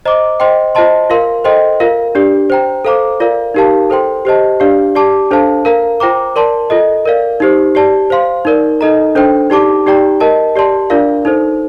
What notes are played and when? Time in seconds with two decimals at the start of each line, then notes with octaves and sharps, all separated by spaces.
0.05 C5 D#5 A#5 D6
0.40 C5 D#5 G5 C6
0.75 F4 C5 D#5 A5 C6
1.10 F4 A#4 F5 C6
1.44 A4 C5 D#5 G5 C6
1.80 F4 A#4 F5
2.15 D4 G4 D5
2.50 C5 G5 A#5
2.85 A4 C5 F5 A#5 D6
3.20 F4 A#4 D5 F5
3.54 D#4 G4 A#4 F5 A5
3.90 A4 C5 G5 C6
4.25 G4 C5 D#5 A5
4.60 D4 G4 D5 F5
4.95 G4 D5 A5 D6
5.31 D4 A4 C5 F5 A5
5.65 A#4 F5 A#5
6.00 F4 C5 G5 A#5 D6
6.36 A#4 D5 A5 C6
6.70 F4 A4 D#5
7.05 A#4 D5 F5
7.40 D#4 G4 C5
7.75 G4 D5 A5
8.10 C5 F5 C6
8.45 D#4 A#4 D5
8.81 D#4 A4 D#5 A#5
9.15 D4 A4 C5 G5
9.50 D#4 G4 D5 A5 D6
9.86 D#4 G4 D5 G5 A#5
10.20 A#4 D#5 A5
10.55 G4 D5 A5 C6
10.90 D4 F4 A#4 D5 F5
11.25 D#4 A4 C5